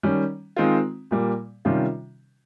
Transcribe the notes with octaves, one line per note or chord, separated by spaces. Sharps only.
D#3 G3 C#4
D#3 G#3 C4 F4
A#2 G3 A#3
C3 D#3 G3 C#4 F4